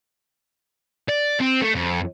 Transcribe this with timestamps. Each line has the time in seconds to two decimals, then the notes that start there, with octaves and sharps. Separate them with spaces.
1.09 D5
1.40 C4
1.62 A3
1.75 F2